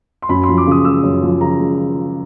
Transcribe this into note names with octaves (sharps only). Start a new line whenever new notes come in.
C6
F#2 B5
C6
F3
D6
C#3 D#6
G#3 E6
F#2
F3
C#3 A#5
G#3